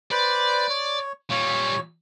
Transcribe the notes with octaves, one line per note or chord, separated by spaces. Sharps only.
B4 C5 D5 B5
C#5
A#2 G3 C#5